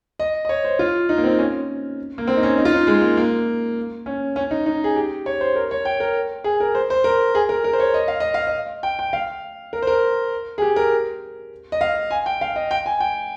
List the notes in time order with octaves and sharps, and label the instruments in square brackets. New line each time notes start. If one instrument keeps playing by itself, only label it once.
[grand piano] D#5
D#5
C#5
C5
F4
D#4
A#3
C4
C#4
A#3
C4
D#4
C#4
D#4
F4
D#4
G#3
A#3
A#3
C#4
C#4
D#4
D#4
G#4
G4
C#5
C5
A#4
C#5
G5
A#4
G#4
A#4
C5
C5
A#4
G#4
A#4
A#4
C5
C#5
D#5
F5
D#5
F5
D#5
G5
G5
F5
A#4
C5
A#4
G#4
G4
A#4
D#5
F5
G#5
G5
F5
D#5
G5
G#5
G5